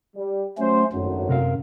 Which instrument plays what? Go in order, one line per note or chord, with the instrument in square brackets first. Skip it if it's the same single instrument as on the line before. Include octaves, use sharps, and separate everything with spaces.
[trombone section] G3
[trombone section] F#3 C5 [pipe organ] A3 C#4
[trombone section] G#1 A2 F#3 [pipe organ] F#2
[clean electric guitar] C3 A#4 F5